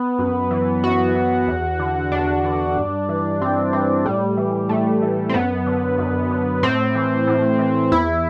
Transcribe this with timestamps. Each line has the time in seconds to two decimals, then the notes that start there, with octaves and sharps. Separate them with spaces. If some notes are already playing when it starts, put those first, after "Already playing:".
Already playing: B3
0.19 F#2
0.51 E3
0.84 F#2 F#4
1.15 E3
1.48 E2
1.80 D3
2.12 E2 D4
2.45 D3
2.76 G2
3.09 E3
3.41 G2 C4
3.73 E3 C4
4.05 A2 G3
4.37 E3
4.69 A2 A3
5.02 E3
5.29 C4
5.34 F#2 B3
5.66 D3
5.98 F#2
6.31 D3
6.63 A2 C4
6.95 E3
7.27 A2
7.59 E3
7.92 E2 E4